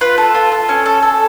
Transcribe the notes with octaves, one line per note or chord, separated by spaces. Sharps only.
F4 B4
A4
F4
A4
C#4
A4
A4